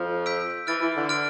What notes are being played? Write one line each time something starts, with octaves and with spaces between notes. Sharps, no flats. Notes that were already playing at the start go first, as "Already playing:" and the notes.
Already playing: F2 F3
E6 G6 B6 D7
E3 F6 A6 D7
E3
D3
F6 A6 D7